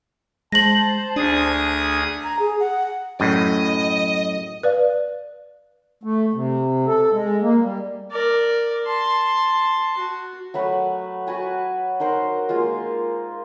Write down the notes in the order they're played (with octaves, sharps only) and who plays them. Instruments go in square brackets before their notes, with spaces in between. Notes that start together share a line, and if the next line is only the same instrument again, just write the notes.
[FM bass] G#3 [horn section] C5 A5 [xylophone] A#6 F#7
[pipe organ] D2 G#4 D#6 [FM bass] D4
[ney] A#5
G#4
F#5
[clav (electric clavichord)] F#2 A2 [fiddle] D#5
[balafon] B4 D5 F5
[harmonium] A3
C3
A4
G#3
A#3
G3
[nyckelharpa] A#4 D5
A5 C6
F#4
[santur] F#3 A3 B4 F#5
F#4 B4 G#5 A5
D#4 A#4 C5 F#5
G#3 A#3 F4